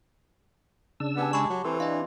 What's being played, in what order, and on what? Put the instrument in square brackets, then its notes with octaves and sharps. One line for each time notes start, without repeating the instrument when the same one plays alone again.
[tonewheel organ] C#3 D4 E6
[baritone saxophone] B3 [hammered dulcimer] G4 G#5 A5
[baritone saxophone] G#3 [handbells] B5 C#6
[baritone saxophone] F#3
[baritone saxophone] E3 [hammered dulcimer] C4 [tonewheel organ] A4 C5
[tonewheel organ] D4 [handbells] D#5 F5